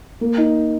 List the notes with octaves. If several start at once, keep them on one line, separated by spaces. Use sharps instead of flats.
A#3
D#4